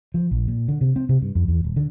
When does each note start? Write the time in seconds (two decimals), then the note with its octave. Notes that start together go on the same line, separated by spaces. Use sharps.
0.14 F3
0.31 A#1
0.48 A#2
0.68 D3
0.81 C3
0.96 C4
1.09 C3
1.22 G2
1.35 F2
1.48 E2
1.64 D#1
1.76 D3